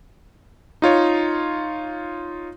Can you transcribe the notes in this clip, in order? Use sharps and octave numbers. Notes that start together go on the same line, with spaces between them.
D#4 F4 C#5